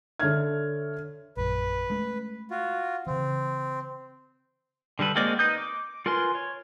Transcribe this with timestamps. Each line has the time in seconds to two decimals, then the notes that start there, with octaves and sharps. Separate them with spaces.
0.19 D3 A4 C#5 E5 F6 G#6
1.37 A#1 F#2 B4
1.90 G#3 A3 C#4
2.51 F4 F#4
3.07 C#3 E3 C4
4.99 D3 G3 A4 B4
5.15 G#3 A#3 C4 F#4 D5
5.39 D#4 B4 D#6 G6
5.58 D6
6.06 F4 A#4 B4 G#5 C6
6.35 C#5